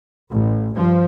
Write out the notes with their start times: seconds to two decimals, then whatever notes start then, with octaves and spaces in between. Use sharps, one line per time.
0.30 A1
0.73 G2 F3